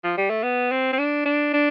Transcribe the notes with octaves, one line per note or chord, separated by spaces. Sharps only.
F3
G3
A3
B3
C4
C4
D4
D4
D4